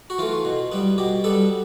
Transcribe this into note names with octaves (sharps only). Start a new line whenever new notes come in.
F#4
E3 A3 F4
B2
G3 B3
B2 G4
G3 B3 A4